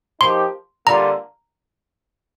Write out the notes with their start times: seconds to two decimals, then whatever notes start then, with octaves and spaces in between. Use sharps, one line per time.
0.21 F3 A#3 D#4 G4 C6
0.86 D3 G3 A#3 F4 A#5